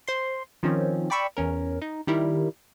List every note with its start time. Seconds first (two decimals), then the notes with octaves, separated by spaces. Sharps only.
0.08 C5 C6
0.63 D#3 F3 C4 C#4
1.10 D5 G5 B5 C#6 E6
1.37 E2 C#4 A#4
1.82 D#4
2.07 D#3 G3 E4 A#4